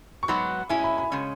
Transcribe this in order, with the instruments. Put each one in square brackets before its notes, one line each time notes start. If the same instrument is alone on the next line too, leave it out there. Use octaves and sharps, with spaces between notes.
[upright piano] C#6
[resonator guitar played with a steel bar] G#2 F#3 B3 F#4 [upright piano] B5
[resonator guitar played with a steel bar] G#3 C#4 E4 [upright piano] G#5
[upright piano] B5
B5
[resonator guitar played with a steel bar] C#3 G#3 C#4